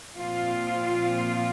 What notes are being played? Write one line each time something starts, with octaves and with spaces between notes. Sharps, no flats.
A#2 F3 C4 F4